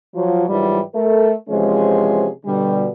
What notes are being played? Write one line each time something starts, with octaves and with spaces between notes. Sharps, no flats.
F3 F#3 F4
G#2 E3 F#3 G3 F4 F#4
A3 A4 A#4
C3 E3 F3 G#3 C#4 G#4
B2 D3 G3